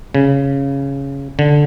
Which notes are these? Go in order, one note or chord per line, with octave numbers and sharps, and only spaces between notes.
C#3
D3